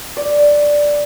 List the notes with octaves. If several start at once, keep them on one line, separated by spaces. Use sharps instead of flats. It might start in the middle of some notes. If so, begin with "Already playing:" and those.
D5